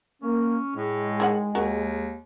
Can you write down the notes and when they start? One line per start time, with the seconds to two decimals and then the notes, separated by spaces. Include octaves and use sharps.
0.22 A#3 C#4
0.75 A2 G#3
1.20 D#3 D4 F#5
1.55 D#2 F#4 A#4